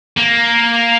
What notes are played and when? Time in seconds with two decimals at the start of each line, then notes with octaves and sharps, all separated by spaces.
0.18 A#3